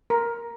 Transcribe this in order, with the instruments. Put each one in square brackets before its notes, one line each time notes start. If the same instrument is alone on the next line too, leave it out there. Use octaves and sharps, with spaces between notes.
[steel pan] A#4